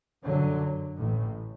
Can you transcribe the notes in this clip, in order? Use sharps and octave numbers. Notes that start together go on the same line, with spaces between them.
G1 F#2 D3 F#3
A1 A2